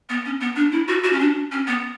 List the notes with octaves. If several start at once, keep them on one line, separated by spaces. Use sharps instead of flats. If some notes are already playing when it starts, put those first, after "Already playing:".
B3
C#4
B3
D4
E4
F#4
F#4
C#4
D4
C#4
B3